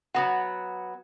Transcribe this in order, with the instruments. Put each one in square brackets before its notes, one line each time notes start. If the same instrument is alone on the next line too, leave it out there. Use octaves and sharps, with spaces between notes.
[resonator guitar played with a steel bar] F#3 B3 F#4 [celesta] F#5